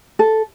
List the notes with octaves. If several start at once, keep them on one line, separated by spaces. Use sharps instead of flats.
A4